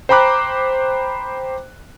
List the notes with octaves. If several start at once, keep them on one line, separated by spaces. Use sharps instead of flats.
C5 G5 A#5 B5 D6 F#6